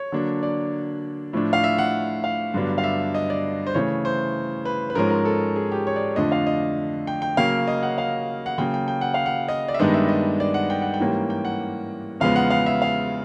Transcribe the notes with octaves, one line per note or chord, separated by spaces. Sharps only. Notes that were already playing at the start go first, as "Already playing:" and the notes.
Already playing: C#5
D3 F#3 A#3 D4
D5
A2 F3 A3 D4
F5
E5
F#5
F5
G2 D3 F#3 B3 D4
F5
E5
D#5
D5
C5
C#3 E3 A3 C#5
C5
B4
B4
G#2 F3 G#3 C#4 A#4
A#4
A4
G#4
G4
C#5
D5
F2 D3 F3 A3 D4 D#5
F5
D#5
G5
G5
C#3 F#3 A#3 C#4 F5
D#5
F#5
F5
F#5
C#3 F#3 A#3 G5
G5
G5
F#5
F5
F#5
D#5
D5
E5
G2 D#3 G#3 B3 D4 D#5
E5
D#5
D5
F#5
G5
F#5
G5
G#2 E3 G3 A#3 C#4
G5
F#5
E2 C#3 F3 G#3 B3 F5
F#5
F5
E5
F5